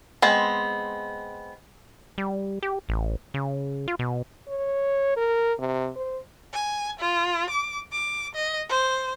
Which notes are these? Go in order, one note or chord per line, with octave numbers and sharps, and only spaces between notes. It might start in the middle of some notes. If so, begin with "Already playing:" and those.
G#3 B3 C4
G3
G4
A1
C#3
F4
B2
C#5
A#4
C3
C5
G#5
F4
D6
D6
D#5
C5